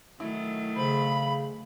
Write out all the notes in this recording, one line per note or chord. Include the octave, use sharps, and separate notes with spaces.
D#3 F#3 A3 E4
C#3 C5 B5